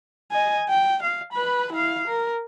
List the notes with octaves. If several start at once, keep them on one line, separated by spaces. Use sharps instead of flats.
D#5 G#5
G5
F5
B4 B5
E4 F5
A#4